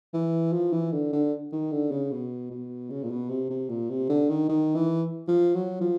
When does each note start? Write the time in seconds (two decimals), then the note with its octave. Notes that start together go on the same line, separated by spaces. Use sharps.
0.13 E3
0.52 F3
0.72 E3
0.92 D3
1.13 D3
1.52 D#3
1.72 D3
1.91 C#3
2.11 B2
2.50 B2
2.90 C#3
3.03 A#2
3.10 B2
3.29 C3
3.50 C3
3.69 A#2
3.90 C3
4.09 D3
4.29 D#3
4.49 D#3
4.75 E3
5.28 F3
5.54 F#3
5.81 F3